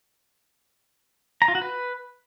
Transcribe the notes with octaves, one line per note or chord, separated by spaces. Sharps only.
A#5
F4
F#4
B4